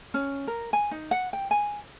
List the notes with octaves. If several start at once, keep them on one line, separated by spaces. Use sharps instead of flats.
C#4
A#4
G#5
D#4
F#5
G5
G#5